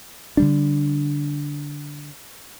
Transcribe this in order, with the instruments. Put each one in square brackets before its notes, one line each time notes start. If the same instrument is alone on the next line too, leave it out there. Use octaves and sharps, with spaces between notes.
[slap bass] D3 G3 D4